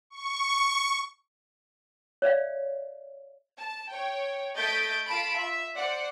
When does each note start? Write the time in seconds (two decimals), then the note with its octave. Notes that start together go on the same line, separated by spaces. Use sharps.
0.10 C#6
2.22 C#5 D5 E5 F5
3.58 A5
3.92 C#5 G5
4.56 A3 D#5 G6 A6 B6 D7
5.06 F4 A5 B5 D7
5.37 E5
5.77 C5 D5 F#5